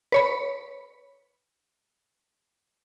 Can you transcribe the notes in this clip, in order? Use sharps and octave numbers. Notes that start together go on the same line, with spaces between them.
B4 C#5 B5